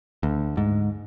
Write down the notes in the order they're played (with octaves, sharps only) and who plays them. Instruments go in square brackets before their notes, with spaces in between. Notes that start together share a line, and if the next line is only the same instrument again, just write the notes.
[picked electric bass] D2
G#2